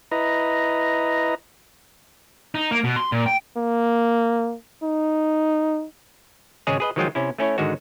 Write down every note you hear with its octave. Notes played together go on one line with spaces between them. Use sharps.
E4 B4 D#5 A#5
D#4
A#3
B2
C6
A#2
G5
A#3
D#4
G#1 C#3 G#3 G#4 C#5
G#4 B4 D#5
D#3 F3 F#3 G#3 F4 G5
C3 C#4 E4
A3 C#4 E4 C#5
G#2 D3 D#3 G#3 F#4